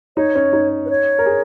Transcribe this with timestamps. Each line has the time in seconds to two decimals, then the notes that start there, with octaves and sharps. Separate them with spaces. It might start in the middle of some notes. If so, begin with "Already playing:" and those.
0.17 D#4 C#5
0.35 C#4
0.53 D#4
0.85 B4
0.90 C#5
1.19 A#4
1.26 G#4